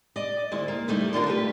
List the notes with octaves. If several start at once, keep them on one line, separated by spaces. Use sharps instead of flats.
D5 D#5
D2 E4
A#3
G3 A3 D#4 E4
D3 D4 F4 A#4
A3 G4 B4